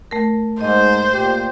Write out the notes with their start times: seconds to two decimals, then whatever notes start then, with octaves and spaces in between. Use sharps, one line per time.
0.11 A3 A#4
0.61 G#2 C5 D#5
1.13 A#2 G4